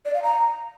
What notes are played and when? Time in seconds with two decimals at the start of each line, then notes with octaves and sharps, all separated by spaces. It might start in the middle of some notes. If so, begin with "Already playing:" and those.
0.05 D5
0.14 F5
0.23 A#5